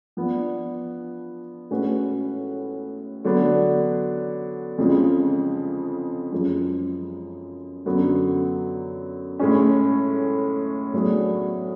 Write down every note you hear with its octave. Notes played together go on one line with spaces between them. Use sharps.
F3 B3 D4
A2 G#3 C#4 F#4 B4
D3 F#3 B3 D4
F2 C#3 F3 G#3
F#2 F3 G#3
F#2 D3 F#3 B3
A2 G#3 C#4
A2 F#3 B3 D4 G#4